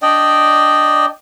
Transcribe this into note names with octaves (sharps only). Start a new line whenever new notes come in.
D4 D5 D#5 G5